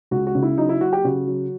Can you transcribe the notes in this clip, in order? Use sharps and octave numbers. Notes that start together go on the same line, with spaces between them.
C#2 F#4
F#4
C#3
E4
F#3 D#4
E4
F#3 F#4
G4
C#3 F#4
F#3